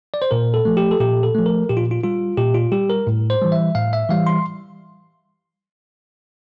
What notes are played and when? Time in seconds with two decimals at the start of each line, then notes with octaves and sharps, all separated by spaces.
0.14 D5
0.22 C5
0.31 A#2 A#4
0.54 A4
0.65 F3 A3
0.77 G4
0.91 A4
1.00 A#2 G4
1.23 A4
1.35 F3 A3
1.46 A#4
1.69 A#2 G4
1.77 F4
1.91 F4
2.04 G3 F4
2.37 A#2 G4
2.55 F4
2.72 G3 G4
2.90 A#4
3.07 A2
3.30 C5
3.42 E3 G3
3.52 E5
3.75 A2 F5
3.93 E5
4.09 E3 G3 F5
4.27 C6